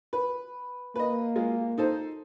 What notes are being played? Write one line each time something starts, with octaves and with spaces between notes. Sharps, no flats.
B4
A#3 B4 D#5
G#3 F4
D#4 A4 C5